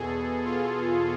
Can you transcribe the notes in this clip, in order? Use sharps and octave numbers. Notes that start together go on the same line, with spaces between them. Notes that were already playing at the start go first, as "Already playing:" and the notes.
Already playing: E2 B2 G#4 A4
F4